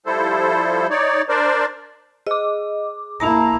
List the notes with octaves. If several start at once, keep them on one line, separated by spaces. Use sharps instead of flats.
F3 G3 E4 A4 C5
D#4 C#5 D5
D4 A#4 C5 D5
G#4 D#5 D6
A#3 E4 A5 A#5 A#6 F7